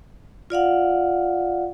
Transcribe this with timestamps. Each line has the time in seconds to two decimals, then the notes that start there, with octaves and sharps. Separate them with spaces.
0.50 F4 D5 F5 F#5